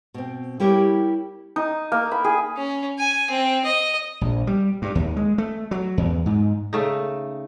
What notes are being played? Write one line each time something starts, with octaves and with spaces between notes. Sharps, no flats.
B2 C4
G3 E4 G4 A#4 C#5
D#4
A#3
B5
G#4
C#4
G#5
C4
D#5
A#1
G3
G2
D#2
G#3
A3
F#3
E2
G#2
C#3 A3 D#4